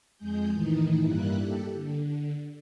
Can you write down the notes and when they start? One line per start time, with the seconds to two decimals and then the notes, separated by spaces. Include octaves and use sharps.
0.17 F2 G#3 G#4 G6
0.53 A2 D#3 E3 D#4
1.02 G2 G3 A#3 E4 F#6
1.39 G4 A4
1.73 D3